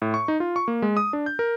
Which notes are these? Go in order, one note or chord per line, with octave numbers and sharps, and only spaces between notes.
A2
C#6
D#4
F4
C#6
A#3
G#3
D#6
D4
G6
A#4